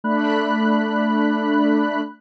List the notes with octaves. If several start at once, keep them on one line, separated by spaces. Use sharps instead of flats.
A3 D4 B5 F#6